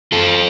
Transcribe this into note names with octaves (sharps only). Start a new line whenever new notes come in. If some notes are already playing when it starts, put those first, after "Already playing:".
F4 A4